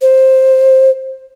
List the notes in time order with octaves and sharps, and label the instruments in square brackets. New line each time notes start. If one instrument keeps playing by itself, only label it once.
[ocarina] C5